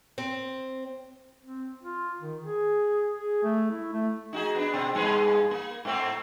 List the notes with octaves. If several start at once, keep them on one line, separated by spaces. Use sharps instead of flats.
C4
C4
F4
D#3
G#4
G#4
A3
E4
A3
D#4 F#4 G#4
B3 D4
B2 C4
G2 B3 G#4
A#3
G#2 A3 C4